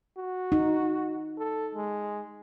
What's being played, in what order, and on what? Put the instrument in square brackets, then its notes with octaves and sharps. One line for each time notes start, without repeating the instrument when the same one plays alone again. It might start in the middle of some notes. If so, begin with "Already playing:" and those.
[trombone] F#4
[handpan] D#4
[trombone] A4
G#3